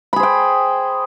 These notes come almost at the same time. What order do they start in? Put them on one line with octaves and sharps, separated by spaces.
B5 G#4 C5 G5